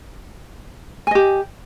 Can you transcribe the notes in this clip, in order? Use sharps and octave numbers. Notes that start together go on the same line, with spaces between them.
G4 D#5 G#5